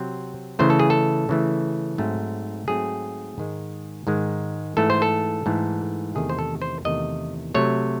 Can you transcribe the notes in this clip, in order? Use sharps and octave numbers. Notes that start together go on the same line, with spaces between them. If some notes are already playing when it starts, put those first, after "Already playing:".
Already playing: C3 F#3 C4 C5
C#3 E3 A3 C5
A4
G#4
A4
C#3 E3 A3
G#2 F#3 A3 C4
G#2 F#3 A3 C4 G#4
G#2 D#3 G#3
G#2 D#3 G#3
G#2 E3 A3 A4
C5
A4
G#2 E3 A3
E2 C3 D#3 A3 G#4
C5
A4
C5
E2 C3 D#3 A3 D#5
C3 F#3 A3 C#5